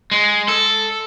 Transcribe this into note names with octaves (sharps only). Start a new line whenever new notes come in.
G#3
A4